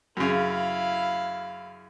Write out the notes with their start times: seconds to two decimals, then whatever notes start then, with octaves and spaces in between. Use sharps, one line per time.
0.17 F#2 C#3 E4 F5